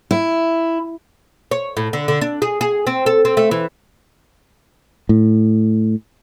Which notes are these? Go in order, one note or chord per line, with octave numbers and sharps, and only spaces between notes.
E4
C#5
A2
D3
D3
D4
G#4
G#4
C4
A4
C4
A3
E3
A2